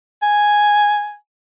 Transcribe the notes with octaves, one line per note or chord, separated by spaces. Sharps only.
G#5